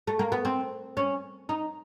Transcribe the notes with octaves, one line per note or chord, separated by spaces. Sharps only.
A3
A#3
B3
C4
C#4
D#4